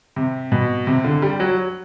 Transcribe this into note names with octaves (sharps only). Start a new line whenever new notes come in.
C3
B2
C3
D3
G3
F#3